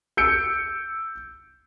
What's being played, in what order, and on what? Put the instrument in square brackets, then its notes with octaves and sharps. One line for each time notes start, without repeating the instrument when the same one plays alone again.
[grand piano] E6 G6 C#7 D7